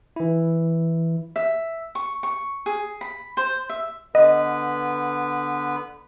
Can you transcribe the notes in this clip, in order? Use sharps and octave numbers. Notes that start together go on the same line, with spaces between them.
E3 E4
E5
C#6
C#6
G#4
B5
C5
E5
D3 B3 B4 D#5